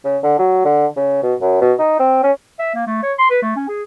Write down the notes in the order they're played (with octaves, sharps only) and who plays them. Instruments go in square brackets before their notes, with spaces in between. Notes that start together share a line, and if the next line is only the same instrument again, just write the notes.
[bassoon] C#3
D3
F#3
D3
C#3
B2
F#2
B2
D#4
C4
C#4
[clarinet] E5
A#3
A3
C#5
C6
B4
A3
C#4
G#4